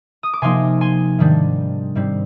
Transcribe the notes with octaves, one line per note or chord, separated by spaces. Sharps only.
D#6
D6
C3 F3 A#3 D#4 G#5 C6
G#5 C6
G#2 D#3 G3 D4
G#2 G3 C4